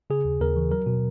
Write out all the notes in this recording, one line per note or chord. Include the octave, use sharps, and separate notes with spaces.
C#3 G#4
D#2
D#2 A#4
E3
F#3 A#4
B2